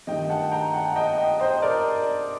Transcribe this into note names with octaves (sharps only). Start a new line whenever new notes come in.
G2 D#3 A3 D#5 G5
F#5 A5
G5 A#5
F#5 A5
D#5 G5
D#5 G5
C5 D#5
A#4 D5